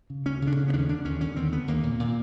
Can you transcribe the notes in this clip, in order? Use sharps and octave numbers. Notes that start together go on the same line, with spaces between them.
C#3
D2 C#4
C#3
D4
D3 C#4
B3
D#2 D4
C#4
D3 D4
D#2 C#4
D3 C#4
D#2 C4
D3 B3
D#2 A#3
A#2
A#2